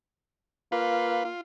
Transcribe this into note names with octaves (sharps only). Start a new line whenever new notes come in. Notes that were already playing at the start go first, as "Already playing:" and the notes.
A#3 F4 B4
F4